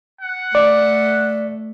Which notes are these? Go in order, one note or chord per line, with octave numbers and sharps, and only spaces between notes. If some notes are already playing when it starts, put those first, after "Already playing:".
F#5
A3 D5